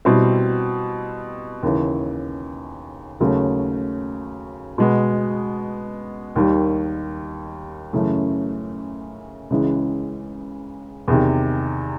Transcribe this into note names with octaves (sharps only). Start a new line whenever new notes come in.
B2 G3 C4 E4
D#2 C#3 E3
D#2 C#3 F#3 A3
B2 G#3 B3
D#2 D#3 G3
F#2 C#3 E3 A3
C#2 C#3 E3 G#3
E2 C3 D#3